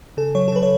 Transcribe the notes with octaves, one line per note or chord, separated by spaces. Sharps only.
C#3 A4
F#3 C#5
A4
C#3 B4
C#5